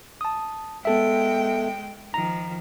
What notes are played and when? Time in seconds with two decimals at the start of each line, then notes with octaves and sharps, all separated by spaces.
0.21 A5 D#6
0.85 G#3 B3 A4 E5 G5
2.14 D#3 F3 A#5